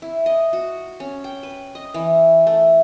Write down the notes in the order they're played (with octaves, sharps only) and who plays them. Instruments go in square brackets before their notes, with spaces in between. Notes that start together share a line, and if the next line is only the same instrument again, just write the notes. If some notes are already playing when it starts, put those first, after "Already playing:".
[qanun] E4
D#5
F#4
C#4
G5
B4
D#5
E3
A3